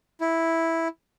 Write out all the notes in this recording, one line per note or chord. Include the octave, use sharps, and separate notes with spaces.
E4